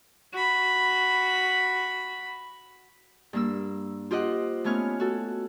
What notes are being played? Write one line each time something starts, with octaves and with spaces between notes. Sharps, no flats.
F#4 B5
G2 A#3 E6
F4 G4 C5 D#5 F#5
A3 B3 C#4 C#5 F6
F#4 A4